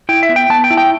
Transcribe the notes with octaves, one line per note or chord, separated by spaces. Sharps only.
E4 G5
E5
B3
G5
B3 A5
G5
E4
G5